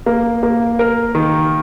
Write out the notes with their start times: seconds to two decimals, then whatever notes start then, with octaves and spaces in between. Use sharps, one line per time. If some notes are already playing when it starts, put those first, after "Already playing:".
0.06 A#3
0.43 A#3
0.79 A#4
1.15 D#3